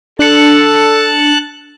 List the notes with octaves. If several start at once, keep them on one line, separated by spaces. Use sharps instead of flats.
D4 A4 A5 F#6 C#7